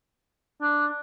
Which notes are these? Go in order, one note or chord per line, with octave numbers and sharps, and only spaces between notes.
D4